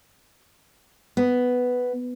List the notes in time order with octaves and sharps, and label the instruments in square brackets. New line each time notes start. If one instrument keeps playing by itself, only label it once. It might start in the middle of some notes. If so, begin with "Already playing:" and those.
[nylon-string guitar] B3